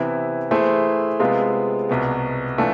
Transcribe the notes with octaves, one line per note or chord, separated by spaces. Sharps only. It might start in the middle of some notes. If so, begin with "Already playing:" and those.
Already playing: C3 E3 B3 E4
E3 A3 E4 G#4 C5
C3 G#3 B3 F4
C2 B2 B3
E3 A3 D4 F4